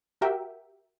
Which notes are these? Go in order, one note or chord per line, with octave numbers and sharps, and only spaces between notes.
F#4 G4 A#4 E5 F#5 G5